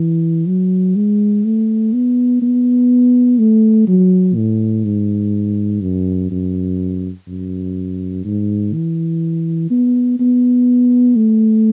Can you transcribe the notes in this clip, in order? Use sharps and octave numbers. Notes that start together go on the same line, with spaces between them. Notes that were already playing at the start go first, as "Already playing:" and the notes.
Already playing: E3
F#3
G#3
A3
B3
B3
A3
F#3
A2
G#2
F#2
F#2
F#2
G#2
E3
B3
B3
A3